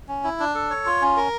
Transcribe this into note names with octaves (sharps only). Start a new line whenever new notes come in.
C#4
E4
D4
A4
C#5
F4
C#4
A#4